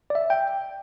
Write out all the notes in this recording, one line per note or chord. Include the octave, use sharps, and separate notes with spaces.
D5
E5
G5